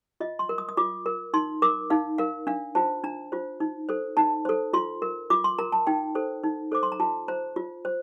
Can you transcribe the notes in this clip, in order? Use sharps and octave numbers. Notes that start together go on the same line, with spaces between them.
F4 D#5
C6
A#4
D#6
D#6
F4 D6
A#4
D#4 C6
A#4 D6
D#4 F5
A#4 F5
D4 F5
F4 C5 A5
D4 A#5
F4 C5
D#4
A4 C5
D#4 A5
A4 C5
F4 C6
A#4
F4 D6
C6
A#4 A#5
A5
D#4 G5
A4 C5
D#4
A4 C5 D6
C6
A#5
F4 A5
C5 A#5
F4
C5